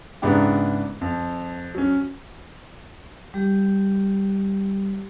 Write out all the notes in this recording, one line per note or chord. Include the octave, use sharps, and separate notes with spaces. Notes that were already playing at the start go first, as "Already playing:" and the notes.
G#2 C#3 B3 D4 E4 G4
F2
F#3 C#4
G3 G4